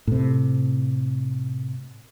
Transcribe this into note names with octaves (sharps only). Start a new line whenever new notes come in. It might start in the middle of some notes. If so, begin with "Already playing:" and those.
A2 C3